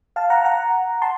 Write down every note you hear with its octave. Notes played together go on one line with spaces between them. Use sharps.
F5 A5
F#5 A#5
F#5 A#5
A5 C6